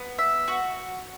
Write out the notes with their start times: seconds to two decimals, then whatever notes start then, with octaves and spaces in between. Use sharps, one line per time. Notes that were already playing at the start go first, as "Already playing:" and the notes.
Already playing: B3
0.19 E5
0.48 F#4